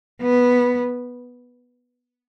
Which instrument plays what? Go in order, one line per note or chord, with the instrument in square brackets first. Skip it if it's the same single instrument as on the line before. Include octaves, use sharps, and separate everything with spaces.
[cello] B3